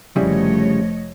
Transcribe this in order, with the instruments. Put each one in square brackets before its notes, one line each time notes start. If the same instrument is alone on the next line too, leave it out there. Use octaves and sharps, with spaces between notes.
[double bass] F1 F3 [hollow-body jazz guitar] C#3 G3 E4 [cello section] A3 C#5 D#5